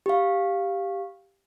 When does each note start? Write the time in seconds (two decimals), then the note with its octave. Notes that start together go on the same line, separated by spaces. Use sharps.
0.06 G4 F5